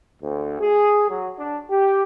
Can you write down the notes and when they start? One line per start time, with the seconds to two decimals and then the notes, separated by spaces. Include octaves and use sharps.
0.22 D2
0.60 G#4
1.09 F#3
1.38 D4
1.70 G4